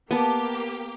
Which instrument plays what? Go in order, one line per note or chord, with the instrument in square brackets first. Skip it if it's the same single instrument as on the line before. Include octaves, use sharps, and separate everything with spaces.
[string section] A#3 G4 [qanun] B3 A5